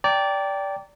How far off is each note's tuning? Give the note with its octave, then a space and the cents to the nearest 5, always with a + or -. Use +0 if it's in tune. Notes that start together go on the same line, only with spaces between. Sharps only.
D5 -20 G5 +0 A#5 -40